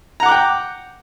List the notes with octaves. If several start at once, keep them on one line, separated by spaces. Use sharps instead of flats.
F#5 G5 A#5 D6 F#6